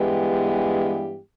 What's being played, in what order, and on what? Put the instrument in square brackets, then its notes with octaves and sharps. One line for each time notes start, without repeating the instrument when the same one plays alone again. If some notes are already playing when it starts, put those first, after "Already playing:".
Already playing: [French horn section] G2 E3 G#3 B3 G4